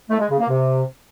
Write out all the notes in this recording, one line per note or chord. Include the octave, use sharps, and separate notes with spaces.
A3
G#3
C#3
A#3
C3